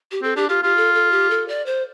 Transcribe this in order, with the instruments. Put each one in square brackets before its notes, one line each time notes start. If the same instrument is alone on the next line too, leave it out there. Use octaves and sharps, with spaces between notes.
[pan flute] G4
[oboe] C4 [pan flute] A4
[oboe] D4 [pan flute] G4
[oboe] F4 [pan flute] G4
[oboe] F4 [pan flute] G4
[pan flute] A4
A4
G4
A4
D5
C5